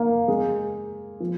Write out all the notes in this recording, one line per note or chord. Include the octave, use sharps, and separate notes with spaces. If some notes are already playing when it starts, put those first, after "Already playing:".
Already playing: A#3
G#3
F3